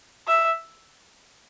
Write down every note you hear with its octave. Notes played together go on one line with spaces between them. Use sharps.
E5